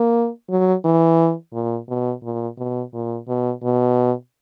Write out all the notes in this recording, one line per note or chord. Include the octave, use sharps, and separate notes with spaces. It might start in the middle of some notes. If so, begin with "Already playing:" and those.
Already playing: A#3
F#3
E3
A#2
B2
A#2
B2
A#2
B2
B2